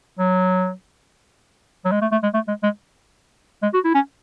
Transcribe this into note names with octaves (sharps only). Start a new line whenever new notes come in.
F#3
F#3
G#3
A3
A3
G#3
A3
G#3
G#3
G#3
F#4
E4
C#4